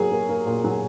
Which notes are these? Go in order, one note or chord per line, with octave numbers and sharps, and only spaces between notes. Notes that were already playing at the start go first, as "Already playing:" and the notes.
Already playing: F#3 A#3 G#4
A#3
A#3
A#2
F#3